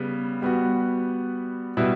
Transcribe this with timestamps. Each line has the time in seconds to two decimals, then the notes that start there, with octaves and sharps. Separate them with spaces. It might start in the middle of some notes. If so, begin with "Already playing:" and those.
Already playing: C#3 G3 B3
0.42 G3 B3 F#4
1.77 B2 G3 B3 E4